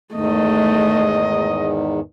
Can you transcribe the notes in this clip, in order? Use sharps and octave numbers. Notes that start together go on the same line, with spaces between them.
E2 G#2 D#3 A3 D#5